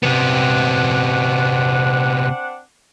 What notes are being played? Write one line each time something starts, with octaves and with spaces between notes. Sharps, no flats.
C3 B3 C4 D4 F#5